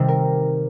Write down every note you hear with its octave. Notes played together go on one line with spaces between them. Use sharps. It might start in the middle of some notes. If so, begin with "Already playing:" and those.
Already playing: C3 D#3 G3 C4 C5
A#4